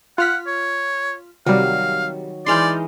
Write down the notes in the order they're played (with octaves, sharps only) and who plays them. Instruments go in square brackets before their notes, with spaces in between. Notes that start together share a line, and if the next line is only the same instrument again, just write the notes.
[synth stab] F4 F6 B6 [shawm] F#5
[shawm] C#5
[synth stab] C3 G3 [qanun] D#3 F#3 [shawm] F5
[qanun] E3 G#3 D#4 [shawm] D5 [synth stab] C6 F6 G6